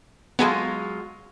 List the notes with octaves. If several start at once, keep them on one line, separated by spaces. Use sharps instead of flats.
F#3 G#3 B3 F4 G#4 A4